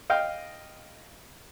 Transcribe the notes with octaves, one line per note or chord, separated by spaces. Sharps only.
D#5 F5 G5